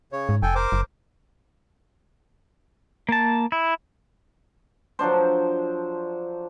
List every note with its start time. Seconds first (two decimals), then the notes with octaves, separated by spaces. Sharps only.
0.12 C#3 C#5
0.29 G#2
0.42 F1 A4 G5 G#5
0.55 A#4 C5 D6
0.72 F#1
3.09 A#3 A5
3.52 E4
4.99 F3 F#3 D4 C5